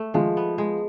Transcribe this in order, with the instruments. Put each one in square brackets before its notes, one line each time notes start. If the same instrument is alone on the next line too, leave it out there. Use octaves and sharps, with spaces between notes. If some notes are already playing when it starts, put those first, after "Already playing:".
Already playing: [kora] A3
[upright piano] F3 [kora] G#3
[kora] B3
G#3